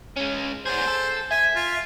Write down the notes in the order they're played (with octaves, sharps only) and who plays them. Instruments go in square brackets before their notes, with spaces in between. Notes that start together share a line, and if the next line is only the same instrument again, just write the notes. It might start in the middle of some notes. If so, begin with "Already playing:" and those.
[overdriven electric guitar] G#3 C#4
[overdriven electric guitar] B3 G#4 [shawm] C5
[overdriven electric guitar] A4
[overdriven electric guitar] E5 [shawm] G#5
[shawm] F4